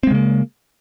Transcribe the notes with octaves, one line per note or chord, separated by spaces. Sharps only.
C#3 G#3 A#3 C4